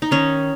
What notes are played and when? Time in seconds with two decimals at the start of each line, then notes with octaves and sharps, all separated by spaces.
0.02 D#4
0.11 D#3 C#4